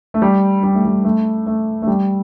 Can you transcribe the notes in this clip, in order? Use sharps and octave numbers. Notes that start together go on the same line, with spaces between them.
A3
G3
G3
A3
G3
A3
A3
A3
G3